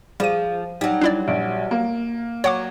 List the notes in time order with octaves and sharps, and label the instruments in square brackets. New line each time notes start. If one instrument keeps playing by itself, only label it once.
[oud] F3 [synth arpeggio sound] G3 D#7 [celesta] G#4 F5
[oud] F#3 G3 [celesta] D#4
[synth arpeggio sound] D4 E4 D5
[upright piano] A#1 [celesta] D7
[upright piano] A#3
[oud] F#3 [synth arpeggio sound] C#5 F#5 D6 [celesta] C#6